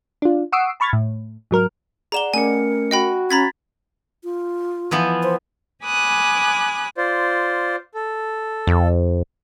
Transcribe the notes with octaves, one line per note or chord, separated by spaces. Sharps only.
D4 F4
F#5 C#6 D#6 E6 C7 D7
A5 B5 C#6 F6 G#6 A6
A2
G#2 F#3 A#4 F6
G#4 D5 F#5 A#5 E7 G7
A3 C#4 A#4 G#5 C#7
F#4 D#5 G5 B5
C#4 A#5 B5 G#6 A6 B6
F4
E3 F3 B3
C5
G#5 B5 D6 D#6 F#6
F4 C5 D5
A4
F2